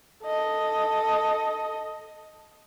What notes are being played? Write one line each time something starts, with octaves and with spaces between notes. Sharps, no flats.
A4 D#5